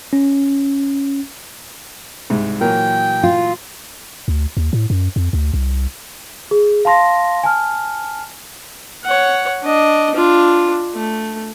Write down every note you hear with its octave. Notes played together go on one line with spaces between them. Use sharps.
C#4
C2 G#2
A#2 E3 F#3 A#4 G5
F4
D2
D#2
A2
F#2
F2
D2
C2
G#4
F5 A5 C6 A#6
G#5 A5 F6
C#5 F#5
D4 D#5
D4 F4
A3